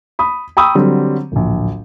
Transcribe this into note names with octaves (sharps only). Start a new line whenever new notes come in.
B5 D#6
G5 A#5 B5 C#6 D#6 E6
D3 F#3 G3 C4
D1 A#1